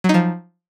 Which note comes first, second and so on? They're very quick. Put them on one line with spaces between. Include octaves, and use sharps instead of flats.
F#3 D#4 F3